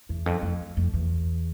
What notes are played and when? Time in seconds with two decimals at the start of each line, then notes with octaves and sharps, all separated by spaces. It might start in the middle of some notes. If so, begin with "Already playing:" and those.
0.09 E2
0.26 F2
0.42 F2
0.77 F2
0.94 E2